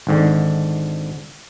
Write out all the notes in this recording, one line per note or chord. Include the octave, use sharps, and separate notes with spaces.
G#1 G#2 D3